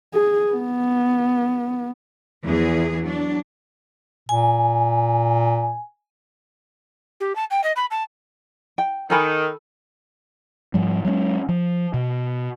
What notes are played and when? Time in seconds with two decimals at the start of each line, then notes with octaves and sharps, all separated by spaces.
0.14 G#4
0.52 B3
2.44 E2 E3 F3 G#4
2.99 F#3 D4
4.29 A#2 G#5
7.20 G4
7.35 A5
7.50 G5
7.63 D#5
7.76 B5
7.91 A5
8.78 G5
9.10 D#3 A4 G#5 B5
10.74 G#2 F3 G3
11.05 F#3 G#3 B3 C#4
11.49 F3
11.94 B2